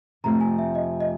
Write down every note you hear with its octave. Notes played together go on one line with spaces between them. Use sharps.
F2 C3 F3 A3 A#5
G#5
E5
D#5
D#5